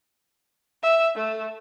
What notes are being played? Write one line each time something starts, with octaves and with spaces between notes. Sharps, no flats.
E5
A3